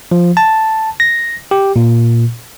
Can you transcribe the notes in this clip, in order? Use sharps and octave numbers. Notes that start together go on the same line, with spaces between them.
F3
A5
A#6
G4
A#2